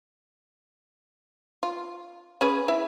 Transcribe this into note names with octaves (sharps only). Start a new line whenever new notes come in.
F4
C#4 G#4 B4
E4 E5